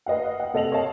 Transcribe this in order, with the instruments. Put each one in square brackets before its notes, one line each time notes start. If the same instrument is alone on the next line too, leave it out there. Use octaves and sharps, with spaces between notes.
[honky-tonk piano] B4 D#5 F5 F#5
F#5 G5
C3 A4 D#5 A#6 F7 F#7
A#3 A4 C#5 D#5 F5 A5